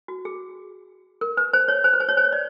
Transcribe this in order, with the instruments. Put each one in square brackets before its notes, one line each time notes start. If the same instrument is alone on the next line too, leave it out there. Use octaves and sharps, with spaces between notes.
[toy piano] F#4
G#4
A#4
B4
C5
C#5
C5
B4
C5
C#5
C5
C#5
D5